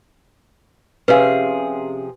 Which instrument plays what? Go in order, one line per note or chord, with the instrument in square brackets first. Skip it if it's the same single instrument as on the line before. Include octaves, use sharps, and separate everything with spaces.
[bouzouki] C3 F3 G#4 [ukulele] C#4 E5 F5 [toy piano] B4